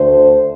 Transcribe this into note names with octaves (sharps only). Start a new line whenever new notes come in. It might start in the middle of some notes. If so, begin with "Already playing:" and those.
Already playing: D2 D3 A3 D4 C5